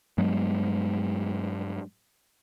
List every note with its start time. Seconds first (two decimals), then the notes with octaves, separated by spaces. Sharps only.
0.18 G2 F#3 G#3 B3